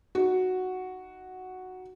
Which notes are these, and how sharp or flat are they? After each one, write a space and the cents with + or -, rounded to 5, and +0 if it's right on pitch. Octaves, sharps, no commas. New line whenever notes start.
D#4 +0 F#4 +0